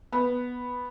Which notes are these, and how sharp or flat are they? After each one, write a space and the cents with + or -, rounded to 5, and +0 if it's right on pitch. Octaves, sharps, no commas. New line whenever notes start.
B3 -5